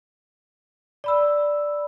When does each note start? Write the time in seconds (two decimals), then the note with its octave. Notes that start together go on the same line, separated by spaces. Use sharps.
1.04 D5 B5 E6